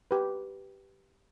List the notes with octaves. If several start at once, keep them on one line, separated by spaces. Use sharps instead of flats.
G4 B4